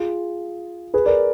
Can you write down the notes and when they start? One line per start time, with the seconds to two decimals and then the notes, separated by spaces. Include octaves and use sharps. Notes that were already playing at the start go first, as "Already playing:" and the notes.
Already playing: F4 G#4
0.94 G#4 B4
1.06 A#4 D5